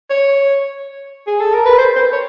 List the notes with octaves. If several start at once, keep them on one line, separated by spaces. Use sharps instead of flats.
C#5
G#4
A4
A#4
B4
C5
C5
C#5